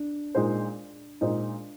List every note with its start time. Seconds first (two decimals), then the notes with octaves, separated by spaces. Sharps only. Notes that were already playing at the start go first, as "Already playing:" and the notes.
Already playing: D4
0.35 A#2 G#3 D#4 G#4 C5
1.21 A#2 G#3 D#4 G#4 C5